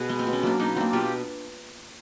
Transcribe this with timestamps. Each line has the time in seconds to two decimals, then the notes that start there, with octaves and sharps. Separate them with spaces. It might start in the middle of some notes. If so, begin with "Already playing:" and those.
Already playing: B2 F#4 G#4
0.09 G#3 B3
0.19 C4
0.27 B2
0.33 C#4
0.43 F#3 A#3 D4
0.59 B2 C#4 D#4
0.76 F#3 A#3 C4 D4
0.93 B2 F4 G4